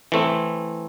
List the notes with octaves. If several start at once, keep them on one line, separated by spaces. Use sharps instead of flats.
E3 A3 C4